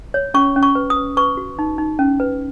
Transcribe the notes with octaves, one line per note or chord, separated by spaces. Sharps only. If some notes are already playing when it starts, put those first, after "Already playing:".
C#5
C#4 C#6
C#4
C#6
B4
D#6
B4
B4 C#6
F#4
D#4
D#4
C#4
B4